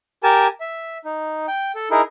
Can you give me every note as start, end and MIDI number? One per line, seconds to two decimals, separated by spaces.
0.23 0.47 67
0.23 0.47 70
0.23 0.47 80
0.23 0.47 81
0.61 0.98 76
1.05 1.46 63
1.48 1.72 79
1.75 1.89 69
1.91 2.02 63
1.91 2.02 64
1.91 2.02 68
1.91 2.02 70